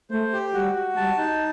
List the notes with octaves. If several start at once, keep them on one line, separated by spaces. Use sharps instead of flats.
A3 C5
G4
G3 F#4
F#4
G3 A5
D#4